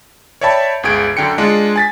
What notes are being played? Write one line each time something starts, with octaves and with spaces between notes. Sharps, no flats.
C#5 D5 E5 G5 A5 B5
G1 C#2 G#4 G#6 D7
F#2 D3 G5 C#7
G#3 D4 F4
G#5 A6 B6